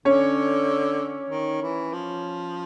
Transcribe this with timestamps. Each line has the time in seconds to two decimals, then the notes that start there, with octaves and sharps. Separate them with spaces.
0.05 D3 C#4 C#5
1.30 D#3
1.62 E3
1.93 F3